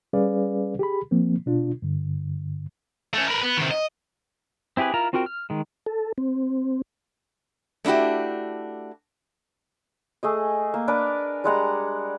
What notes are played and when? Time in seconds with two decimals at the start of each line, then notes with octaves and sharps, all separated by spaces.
0.13 G3 C#4 G#4 B4 D5 F5
0.79 G4 G#4 B5
1.11 F3 A#3 C4
1.46 B2 D4 F4
1.82 G2 D3
3.13 A3 C#4
3.28 A#4 B4
3.43 B3
3.57 C3 D#3
3.71 D#5
4.77 C4 E4 G4 G#4 B4
4.94 E4 F4 A#4 A#5
5.13 C4 F4 F#4 A#4 G5
5.26 F6
5.50 D#3 G#3
5.86 A4
6.18 C4
7.85 A3 D4 E4 F#4 G4
10.23 A3 G#4 D#5
10.74 A#3
10.88 D4 A#4 B4 D5
11.44 G3 G#3 F#5 A#5